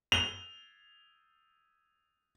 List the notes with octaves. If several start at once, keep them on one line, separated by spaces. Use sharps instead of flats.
F7 G7